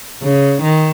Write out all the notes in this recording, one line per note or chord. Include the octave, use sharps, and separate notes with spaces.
C#3
D#3